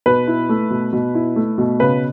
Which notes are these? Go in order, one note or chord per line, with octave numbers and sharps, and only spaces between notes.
B2 B4
E4
A3
B2
B2
E4
A3
B2
C#3 B4